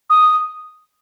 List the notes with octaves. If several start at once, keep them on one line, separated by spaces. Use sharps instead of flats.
D#6